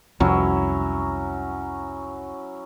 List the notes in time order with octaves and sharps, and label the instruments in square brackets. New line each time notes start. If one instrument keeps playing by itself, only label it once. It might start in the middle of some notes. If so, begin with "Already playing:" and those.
[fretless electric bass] C2 F2 [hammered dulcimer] F#3 C#4 E4